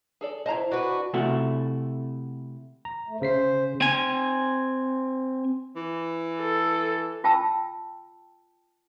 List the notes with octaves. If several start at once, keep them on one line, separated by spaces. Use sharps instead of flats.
G#4 A4 D5
E4 C5 D#5 A5 A#5
D4 F#4 B4
C3 A3 E4 F#4
A#5
A3
C#3 C5 B6 C7
C4 G#5
E3
A4
F4 G5 A5 E6